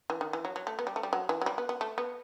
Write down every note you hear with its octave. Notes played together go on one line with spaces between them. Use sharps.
E3
D#3
E3
F#3
F#3
A3
B3
G3
A3
G3
F#3
E3
F#3
G3
B3
B3
A3
B3